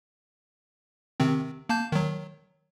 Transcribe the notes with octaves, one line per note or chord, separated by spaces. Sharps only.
C3 D#3 C4
A#3 A5 G6
D#3 F#3